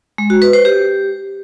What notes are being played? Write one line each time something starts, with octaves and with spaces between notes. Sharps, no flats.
G#3
F#4
B4
C5
G4